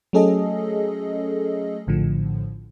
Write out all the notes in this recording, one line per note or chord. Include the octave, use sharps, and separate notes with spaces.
F#3 A3 C#4 G#4 A4 D#5
A#1 A2 D3 F3